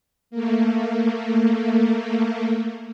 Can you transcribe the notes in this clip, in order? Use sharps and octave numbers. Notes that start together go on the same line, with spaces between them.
A3 A#3